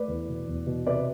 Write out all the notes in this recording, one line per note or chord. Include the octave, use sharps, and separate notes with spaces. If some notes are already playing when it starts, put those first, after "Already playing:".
Already playing: A3 B4 D5
E2
B2
E2
B2
C3 B4 D5